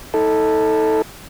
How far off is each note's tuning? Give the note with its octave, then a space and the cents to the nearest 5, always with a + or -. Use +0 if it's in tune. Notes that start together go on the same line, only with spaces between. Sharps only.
D#4 +35 A4 +0